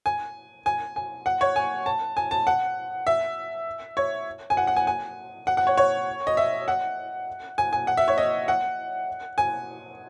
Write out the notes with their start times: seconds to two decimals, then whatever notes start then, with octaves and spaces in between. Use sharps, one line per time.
0.06 G#5
0.66 G#5
0.96 G#5
1.26 F#5
1.41 C#5
1.56 G#5
1.86 A5
2.17 G#5
2.31 A5
2.47 F#5
3.07 E5
3.97 C#5
4.50 G#5
4.57 F#5
4.67 F#5
4.76 G#5
4.87 G#5
5.47 F#5
5.57 F#5
5.67 C#5
5.78 C#5
6.27 D#5
6.37 E5
6.68 F#5
7.58 G#5
7.73 G#5
7.87 F#5
7.97 E5
8.08 C#5
8.18 D#5
8.48 F#5
9.38 G#5